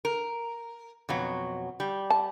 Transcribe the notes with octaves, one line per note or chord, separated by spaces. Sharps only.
A#4
F2 B2 F#3
G3
A5